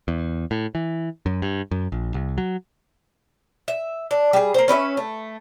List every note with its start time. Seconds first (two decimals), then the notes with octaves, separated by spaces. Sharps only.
0.08 E2
0.51 A2
0.75 E3
1.26 F#2
1.42 G2
1.71 F#2
1.92 A#1
2.14 C2
2.38 F#3
3.68 E5
4.11 D4
4.33 G3 G#4
4.54 A#3 C5
4.68 C#4 B4 D5 E5
4.97 A3